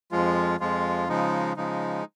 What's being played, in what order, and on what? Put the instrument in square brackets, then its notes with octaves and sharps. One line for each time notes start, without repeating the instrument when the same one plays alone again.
[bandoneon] F2 F3 G#3 F4
F2 F3 G#3 F4
C#3 F3 G#3 D#4
C#3 F3 G#3 D#4